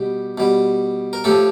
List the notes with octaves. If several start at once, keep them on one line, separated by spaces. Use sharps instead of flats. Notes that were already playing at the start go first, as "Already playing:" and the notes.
Already playing: B2 G3 G4
B2 G3
A#4
A2 F3 G4 A4